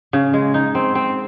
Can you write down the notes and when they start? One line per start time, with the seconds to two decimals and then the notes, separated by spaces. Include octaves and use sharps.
0.13 C#3
0.33 G#3
0.54 D#4
0.75 C4
0.95 C4